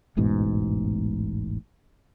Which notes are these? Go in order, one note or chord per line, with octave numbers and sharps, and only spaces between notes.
E1 A1 G#2 B2